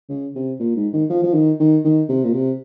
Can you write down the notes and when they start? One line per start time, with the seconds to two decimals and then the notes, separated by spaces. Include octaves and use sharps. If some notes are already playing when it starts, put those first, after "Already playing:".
0.09 C#3
0.35 C3
0.60 A#2
0.76 G#2
0.93 D#3
1.10 F3
1.23 F3
1.34 D#3
1.60 D#3
1.84 D#3
2.09 C3
2.24 A#2
2.34 C3